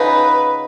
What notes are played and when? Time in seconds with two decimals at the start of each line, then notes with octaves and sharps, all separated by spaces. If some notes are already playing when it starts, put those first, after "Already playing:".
Already playing: C#3 F3 B3 D#4 B4